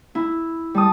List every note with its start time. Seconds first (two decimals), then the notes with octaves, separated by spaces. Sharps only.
0.15 E4
0.74 G3 A5 D#6